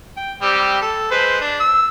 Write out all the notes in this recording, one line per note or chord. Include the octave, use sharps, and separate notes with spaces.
G5
G3 C4 G4
A4
G#3 B4 C5
D4
E6